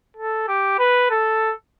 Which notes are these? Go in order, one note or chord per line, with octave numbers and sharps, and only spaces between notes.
A4
G4
B4
A4